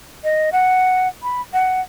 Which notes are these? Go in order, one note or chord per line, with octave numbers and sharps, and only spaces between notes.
D#5
F#5
B5
F#5